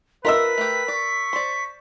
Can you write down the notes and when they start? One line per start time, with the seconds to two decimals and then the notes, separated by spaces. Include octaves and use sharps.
0.25 F4 A#4 B4 D#5 E5 E6 B6
0.58 A3 G4
0.88 D5 C#6
1.33 C5 D5